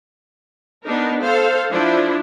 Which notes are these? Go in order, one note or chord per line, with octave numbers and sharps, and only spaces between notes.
B3 D4 D#4 A#4
A4 C5 F5
F3 D4 E4